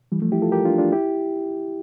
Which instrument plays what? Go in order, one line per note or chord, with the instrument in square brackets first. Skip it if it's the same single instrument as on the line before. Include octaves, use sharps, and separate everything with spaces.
[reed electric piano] E3 G3
F3 A3
E4 G4
F4 A4
G4 A#4
D4 F4
D4 F4
E4 G4